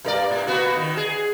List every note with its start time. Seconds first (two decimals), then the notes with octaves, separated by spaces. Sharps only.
0.05 G2 A#4 D5
0.31 A2
0.47 A#3 B3 F#4
0.75 D#3
0.97 G#4